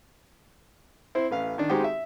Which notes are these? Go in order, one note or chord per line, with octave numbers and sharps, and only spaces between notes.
C4 E4 C5
A1 B4 F5
D#3 D4
G#3 C4 D#4 F#4 G4
E5